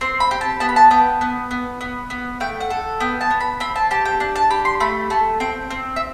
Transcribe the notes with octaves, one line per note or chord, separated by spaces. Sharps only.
C4 C6
B5
G4
A5
B3 A5
B5
A5
B3 G5
B3
B3
B3
B3
A3 G5
F#5
A4
B3 G5
A5
B3
B5
C4 B5
A5
G4 A5
G5
D4 A5
A5
G4 B5
C6
A3 B5
A3 A5
C4 G5
C4
E5